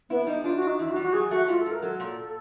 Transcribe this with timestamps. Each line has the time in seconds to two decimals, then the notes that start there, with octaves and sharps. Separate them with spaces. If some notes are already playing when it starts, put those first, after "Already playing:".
0.10 B3 E4
0.27 G3 D#4
0.44 D4 F4
0.56 F#4
0.62 D4
0.67 D#4
0.79 E2 E4
0.91 F#4
0.96 G3
1.02 F#4
1.13 F#3 G#4
1.31 A3 F#4
1.48 G#2 F4
1.60 A4
1.66 G#2
1.71 A#4
1.82 F#3 A4
2.00 A#2